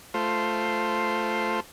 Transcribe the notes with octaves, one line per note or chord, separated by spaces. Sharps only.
A3 F4 C5